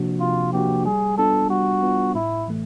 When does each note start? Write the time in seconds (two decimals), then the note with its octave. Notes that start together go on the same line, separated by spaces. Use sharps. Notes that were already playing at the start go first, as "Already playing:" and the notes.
Already playing: C3 F3 A#3 D4 F#4
0.20 C3 F4
0.53 F3 A#3 D4 F#4 G4
0.85 G3 G#4
1.18 B3 D4 F4 A4
1.50 G3 F#4
1.83 B3 D4 F4
2.15 A2 E4
2.48 E3 A3